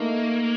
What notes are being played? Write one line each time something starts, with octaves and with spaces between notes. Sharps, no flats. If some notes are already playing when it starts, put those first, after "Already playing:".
Already playing: A3 A#3 D#4 A#4